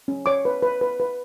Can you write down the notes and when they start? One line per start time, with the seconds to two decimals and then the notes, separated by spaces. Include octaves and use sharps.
0.08 C#4
0.26 C#5 D6
0.45 B4
0.62 B4
0.81 B4
1.00 B4